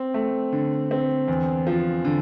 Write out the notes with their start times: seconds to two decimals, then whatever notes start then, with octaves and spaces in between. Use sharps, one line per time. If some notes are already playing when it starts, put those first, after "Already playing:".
Already playing: C4
0.14 A3
0.52 D3
0.91 C4
1.28 E2
1.67 F3
2.05 D3